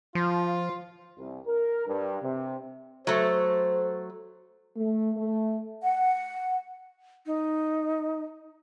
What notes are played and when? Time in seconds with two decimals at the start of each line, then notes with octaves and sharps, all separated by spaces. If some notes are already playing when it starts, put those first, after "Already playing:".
0.15 F3 F4
1.18 C2
1.47 A#4
1.87 G2
2.23 C3
3.07 F#3 A3 C5
4.76 A3
5.17 A3
5.82 F#5
7.26 D#4